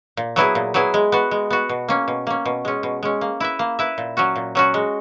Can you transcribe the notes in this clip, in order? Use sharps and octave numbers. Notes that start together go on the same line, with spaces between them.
A#2
F#3 B3 E4 G#4
A#2
F#3 B3 E4 G#4
G#3
B3 F#4
G#3
B3 F#4
B2
A#3 C#4
B2
A#3 C#4
B2
G#3 C#4
B2
G#3 C#4
A#3
E4 B4 E5
A#3
E4 B4 E5
A#2
F#3 C#4 F#4
A#2
F#3 C#4 F#4
G#3